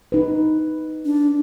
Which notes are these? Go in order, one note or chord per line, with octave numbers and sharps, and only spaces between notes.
D#4 B4
D4